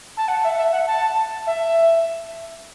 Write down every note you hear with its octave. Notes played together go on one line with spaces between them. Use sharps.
A5
F#5
E5
E5
F#5
A5
E5